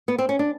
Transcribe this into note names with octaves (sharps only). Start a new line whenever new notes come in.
B3
C4
C#4
D4